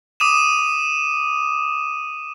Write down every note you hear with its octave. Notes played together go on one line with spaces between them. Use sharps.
D6 D#6 D#7 E7